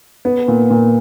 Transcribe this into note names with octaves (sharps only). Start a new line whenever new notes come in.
B3
A#2
A#2